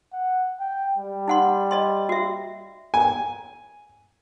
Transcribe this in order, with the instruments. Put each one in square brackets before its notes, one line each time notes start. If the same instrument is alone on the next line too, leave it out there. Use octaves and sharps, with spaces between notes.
[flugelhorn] F#5
G5
G3
[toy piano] D#4 F#5 C6
D5 D#5 C6
F#4 E5
[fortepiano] G#5